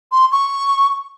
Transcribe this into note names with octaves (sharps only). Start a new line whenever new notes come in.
C6
C#6